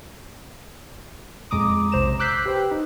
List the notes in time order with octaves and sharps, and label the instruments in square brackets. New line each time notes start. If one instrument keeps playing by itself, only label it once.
[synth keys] F2 A#2 G#3 A#5 D6 D#6
B1 C3 C5 A#5 E7
D6 E6 F#6 G6 B6 C7
G4 B4 C5 G5
D#4